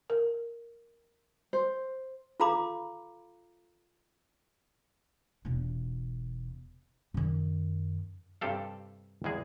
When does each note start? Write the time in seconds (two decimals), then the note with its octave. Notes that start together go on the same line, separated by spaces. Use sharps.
0.10 A#4
1.53 C5
2.40 F4 A4 F5 A#5 B5 D6
5.45 E1 F4
7.14 F#2 D#3
8.41 G2 C3 G4 A4 F5
9.24 E2 G3 G#3 G#4